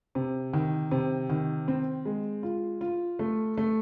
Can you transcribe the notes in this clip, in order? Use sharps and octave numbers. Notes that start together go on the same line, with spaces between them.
C3
D#3
C3
D#3
C4
G#3
F4
F4
A3
A3